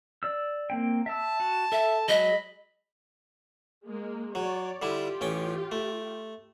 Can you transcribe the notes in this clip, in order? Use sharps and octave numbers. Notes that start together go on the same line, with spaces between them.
D5 E6
A#3 C4 G5
E5 A5 E6
F#4
A4 E5
F#3 G#3 G#4 D#5 B5
G#3 A#3
F#3 C#5 D5
D3 G3 E4 F4 G4
A1 C#4 G5
A3